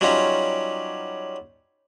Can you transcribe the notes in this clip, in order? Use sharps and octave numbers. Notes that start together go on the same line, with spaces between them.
F#3 G3 C#4 D#4 F4 G4